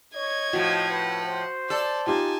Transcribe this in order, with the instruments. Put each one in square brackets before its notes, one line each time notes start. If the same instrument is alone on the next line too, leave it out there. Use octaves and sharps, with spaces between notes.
[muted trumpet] C#5 [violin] D#5 G#6
[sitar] A2 F3 [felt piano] F#4
[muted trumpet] B4 [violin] F#5
[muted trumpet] C5
[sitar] A4 [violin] D5
[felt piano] D#4 F4 G4 [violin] G#5 A5